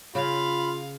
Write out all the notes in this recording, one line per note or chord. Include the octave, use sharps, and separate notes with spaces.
C#3 F4 F5 B5